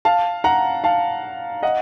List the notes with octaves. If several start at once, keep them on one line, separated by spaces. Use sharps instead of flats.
F5 A5
F#5 A#5
F5 A5
D#5 F#5